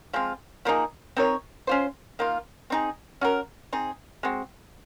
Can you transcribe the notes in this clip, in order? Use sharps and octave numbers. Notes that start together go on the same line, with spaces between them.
F3 G#3 C4 F4
F3 A#3 D#4 G#4
C4 D#4 A#4 C#5
C#4 F4 C5
D#3 A#3 F4
C4 D#4 G#4
C#4 F#4 A#4
C4 D#4 G#4
G#3 C4 F#4